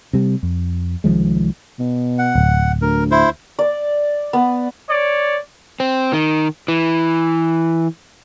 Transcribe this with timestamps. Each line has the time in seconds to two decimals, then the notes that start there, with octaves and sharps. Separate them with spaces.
0.13 C3 G3
0.43 F2
1.04 C2 D#3 F3 G#3
1.79 B2
2.19 F#5
2.35 D1
2.82 D2 A#4
3.11 E4 C5
3.59 D5
4.33 B3
4.88 C#5 D5
5.80 C4
6.13 D#3
6.68 E3